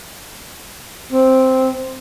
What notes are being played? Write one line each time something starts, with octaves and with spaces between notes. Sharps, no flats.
C4